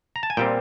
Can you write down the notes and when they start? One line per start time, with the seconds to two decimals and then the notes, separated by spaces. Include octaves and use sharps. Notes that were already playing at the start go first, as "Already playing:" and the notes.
0.16 A#5
0.23 A5
0.30 G#5
0.37 A#2 G3 C4 G5